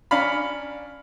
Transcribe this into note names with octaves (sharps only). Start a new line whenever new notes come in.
C#4 D4 F5 A#5 B5